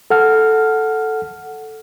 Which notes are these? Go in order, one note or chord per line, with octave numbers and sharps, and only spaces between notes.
A4 F#5 F6